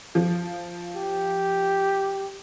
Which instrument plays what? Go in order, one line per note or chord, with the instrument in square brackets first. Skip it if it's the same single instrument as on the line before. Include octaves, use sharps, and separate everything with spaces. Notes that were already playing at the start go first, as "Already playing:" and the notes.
[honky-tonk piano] F3
[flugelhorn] G4